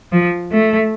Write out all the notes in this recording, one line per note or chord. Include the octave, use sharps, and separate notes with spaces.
F3
A3